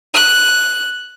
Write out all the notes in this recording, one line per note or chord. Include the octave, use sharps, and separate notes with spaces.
F#6